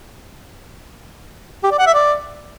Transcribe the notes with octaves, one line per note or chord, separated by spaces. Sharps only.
G4
D5
F#5
E5
D5